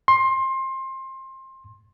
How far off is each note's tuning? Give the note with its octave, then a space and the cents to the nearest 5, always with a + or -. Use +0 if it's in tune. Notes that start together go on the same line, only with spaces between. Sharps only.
C6 +20